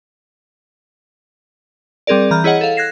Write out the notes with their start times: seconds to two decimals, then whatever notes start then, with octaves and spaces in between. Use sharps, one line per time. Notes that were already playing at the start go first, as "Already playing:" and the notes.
2.07 G3 C4 G#4 A#4 D5
2.31 E3 A#5 F6 G6
2.44 E4 G#4 C#5 D#5 F#5
2.61 A4 F5
2.76 F#6 G#6 A#6 C7 E7